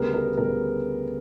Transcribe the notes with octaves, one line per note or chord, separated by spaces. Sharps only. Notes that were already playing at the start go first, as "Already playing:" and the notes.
Already playing: D2 C#3 G3 B3 A#4
A#4
D2 C#3 G3 B3 A#4